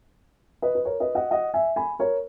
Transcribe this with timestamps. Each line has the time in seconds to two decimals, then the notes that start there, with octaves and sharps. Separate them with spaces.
0.62 B4 D#5
0.75 B4
0.85 A#4 C#5
1.00 B4 D#5
1.15 D#5 F#5
1.31 D#5 F#5
1.54 E5 G#5
1.76 G#5 B5
1.99 A#4 C#5